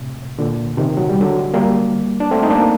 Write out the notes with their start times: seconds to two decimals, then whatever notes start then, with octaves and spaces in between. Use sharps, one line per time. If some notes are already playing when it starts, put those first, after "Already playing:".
Already playing: A2 C3
0.39 A#2 D3
0.77 C3 D#3
0.97 F#3
1.09 G3
1.21 D3 F#3
1.54 G3 A#3
2.20 D4
2.31 A3 C4
2.43 D#4
2.50 A#3 D4